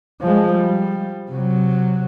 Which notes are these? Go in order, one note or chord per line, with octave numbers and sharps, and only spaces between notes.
F3 G#3
G3
C3 F#3